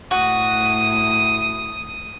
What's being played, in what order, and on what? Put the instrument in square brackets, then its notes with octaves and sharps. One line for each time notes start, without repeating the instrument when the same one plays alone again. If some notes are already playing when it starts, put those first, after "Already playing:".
[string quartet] A2 D#6 [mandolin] F#4